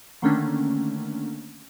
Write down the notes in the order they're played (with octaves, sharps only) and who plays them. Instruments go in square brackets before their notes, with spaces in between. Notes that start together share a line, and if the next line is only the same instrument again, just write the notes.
[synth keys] D3 D#3 A3 A#3 C#4 D4